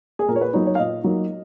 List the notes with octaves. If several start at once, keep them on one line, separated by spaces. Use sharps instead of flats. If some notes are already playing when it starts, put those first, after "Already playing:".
G#4
A#2 A#4
C#5
B4
F#3 A#3 D#4 C#5
C#5
F5
A#2 D#5
F#3 A#3 D#4